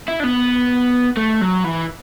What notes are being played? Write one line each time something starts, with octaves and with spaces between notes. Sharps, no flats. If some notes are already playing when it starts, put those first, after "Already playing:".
E4
D4
B3
A3
F#3
E3